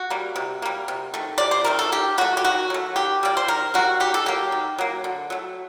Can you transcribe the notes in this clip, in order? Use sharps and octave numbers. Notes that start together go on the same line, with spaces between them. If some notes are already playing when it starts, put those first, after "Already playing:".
Already playing: F#4
G3 A#3
C3
G3 A#3
C3
D#3 A3
C3 D5
C5
D#3 A3 A#4
A4
D#3 G4
F#3 A3 F#4
G4
D#3 F#4
F#3 A3
D#3 G4
G3 A#3 D5
C5
D#3 A#4
G3 A#3 F#4
D#3 G4
A4
F#3 A#3 G4
D#3
F#3 A#3
D3
F#3 A3